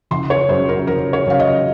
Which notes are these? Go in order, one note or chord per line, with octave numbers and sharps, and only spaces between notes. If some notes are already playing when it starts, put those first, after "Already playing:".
F#1 C6
C#5
F#2 C#3 F#3 C#4 C5
A#4
F#1 A#4
C#5
F#2 C#3 F#3 C#4 F5
D#5